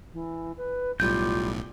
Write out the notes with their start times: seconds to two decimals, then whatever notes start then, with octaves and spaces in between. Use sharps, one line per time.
0.13 E3
0.57 B4
1.00 B1 A2 G3 F4 G6